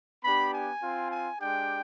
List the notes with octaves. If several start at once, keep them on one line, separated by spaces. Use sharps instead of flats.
B3 D4 G4 B5
G#5
C4 F4
G#5
G#3 D4 G4 G5